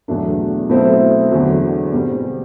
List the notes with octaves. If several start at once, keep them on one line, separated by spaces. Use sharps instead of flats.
E2 B2 F#3 A3 D4
B2 F#3 A3 C4 E4
E2 D3 F#3
B2 G3 C4